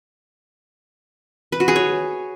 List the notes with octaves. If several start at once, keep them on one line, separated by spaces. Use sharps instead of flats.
B4
F#4
G#4
C#5